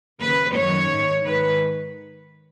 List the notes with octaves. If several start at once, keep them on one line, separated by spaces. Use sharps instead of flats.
D#2 C#3 B4
F#2 D#3 C#5
G#2 D#3
G#2 D#3 B4